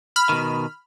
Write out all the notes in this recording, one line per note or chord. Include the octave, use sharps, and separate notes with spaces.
B5 F6
B2 D#3